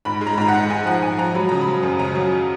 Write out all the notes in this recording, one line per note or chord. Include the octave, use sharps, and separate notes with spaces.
G#2 B5
G#3
A#5
B5
G#2 A#5
F#5
G#3
G#3 G#5
F3 F#5
G#2 G#5
F3 A#5
F#3 B5
C#3 A#5
B5
F#3
F#2
C#3 A#5
F#3